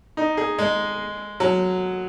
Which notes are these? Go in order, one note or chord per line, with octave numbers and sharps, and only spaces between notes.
D#4
G#4
G#3
F#3